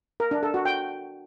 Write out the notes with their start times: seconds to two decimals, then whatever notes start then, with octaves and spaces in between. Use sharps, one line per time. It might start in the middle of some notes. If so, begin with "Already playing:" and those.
0.20 A#4
0.31 D4
0.43 A4
0.54 F#4
0.65 G5